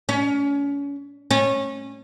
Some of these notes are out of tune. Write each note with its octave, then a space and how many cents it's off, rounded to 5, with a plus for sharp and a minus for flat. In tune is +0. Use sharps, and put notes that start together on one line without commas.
C#4 +35
C#4 -20